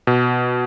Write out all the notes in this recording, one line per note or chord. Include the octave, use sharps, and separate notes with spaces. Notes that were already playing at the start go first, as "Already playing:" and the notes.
B2